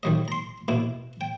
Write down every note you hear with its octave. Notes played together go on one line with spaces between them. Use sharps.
D#3 F#3 D#5
A#5 C6
B2 A#3 E4
G5